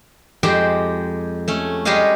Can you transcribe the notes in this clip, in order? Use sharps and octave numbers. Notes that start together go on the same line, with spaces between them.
F2 G#3 G4 C5 G5
A3 C#4
G3 G#3 G4 G#4 D#5 F5